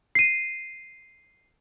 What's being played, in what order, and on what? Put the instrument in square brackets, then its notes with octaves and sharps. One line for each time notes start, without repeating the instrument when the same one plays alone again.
[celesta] C7 D#7